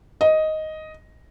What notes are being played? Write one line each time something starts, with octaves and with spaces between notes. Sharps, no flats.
D#5